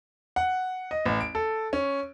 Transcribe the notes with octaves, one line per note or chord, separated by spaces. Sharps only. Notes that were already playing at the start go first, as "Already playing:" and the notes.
F#5
D#5
A1
D7
A4
C#4